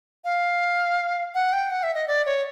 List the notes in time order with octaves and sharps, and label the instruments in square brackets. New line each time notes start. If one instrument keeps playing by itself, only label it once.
[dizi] F5
F#5
G5
F#5
E5
D#5
D5
C#5